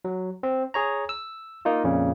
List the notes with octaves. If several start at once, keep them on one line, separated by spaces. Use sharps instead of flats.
F#3
C4
G#4 C#5 A#5
E6
A#3 D#4 F4
F2 A#2 C#3